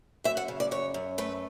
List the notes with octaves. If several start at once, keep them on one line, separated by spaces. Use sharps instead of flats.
F#2 E5
F#5
C#3
D5
F#2 C#5
F#2
A3 B4